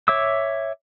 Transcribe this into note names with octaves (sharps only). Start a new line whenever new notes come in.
C#5 E5 D6 E6